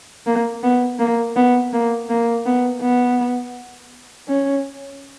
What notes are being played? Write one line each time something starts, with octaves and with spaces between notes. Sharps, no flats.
A#3
B3
A#3
B3
A#3
A#3
B3
B3
C#4